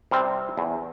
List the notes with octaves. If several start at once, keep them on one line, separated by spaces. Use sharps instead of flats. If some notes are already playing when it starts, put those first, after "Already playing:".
C3 G3 C4
E2